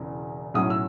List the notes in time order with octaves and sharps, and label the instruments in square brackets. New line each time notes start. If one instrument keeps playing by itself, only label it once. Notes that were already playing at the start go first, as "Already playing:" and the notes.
Already playing: [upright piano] E1 E2 C#3
B1 A2 F#3 C#4 D#6
E6